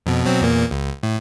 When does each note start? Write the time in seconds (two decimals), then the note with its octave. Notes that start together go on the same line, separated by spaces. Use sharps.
0.06 F2 B2
0.25 B2 F#3 C4
0.41 E2 A#2 A#3
0.71 C#2
1.03 A2